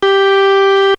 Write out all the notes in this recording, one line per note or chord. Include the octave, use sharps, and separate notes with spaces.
G4